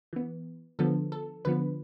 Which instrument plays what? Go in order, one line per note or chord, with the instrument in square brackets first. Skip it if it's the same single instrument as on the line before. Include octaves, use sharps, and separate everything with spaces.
[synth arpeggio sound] E3 B3
D3 F3 B3 A4
A4
D3 F3 B3 B4